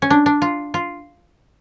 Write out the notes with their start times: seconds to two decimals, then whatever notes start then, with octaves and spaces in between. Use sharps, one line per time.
0.02 C#4
0.10 D4
0.26 D4
0.42 F4
0.74 F4